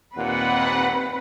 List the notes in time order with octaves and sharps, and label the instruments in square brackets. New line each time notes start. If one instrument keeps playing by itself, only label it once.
[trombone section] D#2 A#2 [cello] C4 B4 [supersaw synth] F#5